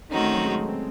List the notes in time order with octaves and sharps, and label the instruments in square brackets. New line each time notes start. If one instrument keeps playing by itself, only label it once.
[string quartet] D#3 A3 C4 D#4 F#4 [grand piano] C#4
[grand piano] F#3
G#3
A3
C4